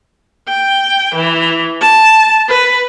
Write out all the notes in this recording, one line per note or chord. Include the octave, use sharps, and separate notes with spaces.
G5
E3
A5
B4